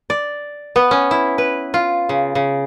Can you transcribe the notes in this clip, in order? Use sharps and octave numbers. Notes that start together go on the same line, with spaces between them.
D5
B3
C#4
E4
B4
F4
C#3
C#3